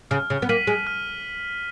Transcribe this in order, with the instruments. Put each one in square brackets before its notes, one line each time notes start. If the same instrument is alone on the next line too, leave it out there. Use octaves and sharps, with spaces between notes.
[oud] C#3 [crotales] F6
[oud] C#3
B3
[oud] A#3 [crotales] B6 D#7 F#7
[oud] G#3
[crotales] F6